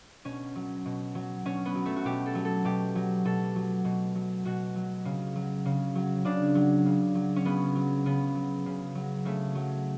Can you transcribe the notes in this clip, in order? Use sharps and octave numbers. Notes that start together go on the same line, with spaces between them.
B2 C#4
F#3
B2
F#3
B2 C#4
B3
F#3
A3
F#4
B2 G4
A4
F#3
A4
B2 G4
F#3
B2 A4
F#3
B2
F#3
B2 F#4
F#3
C#3
F#3
C#3
F#3
C#3 D4
F#3
C#3
F#3
C#4
C#3 B3
F#3
C#3 B3
F#3
C#3
F#3
C#3 A3
F#3